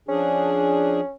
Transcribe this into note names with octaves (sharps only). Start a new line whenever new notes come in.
F3 C#4 D4 G#4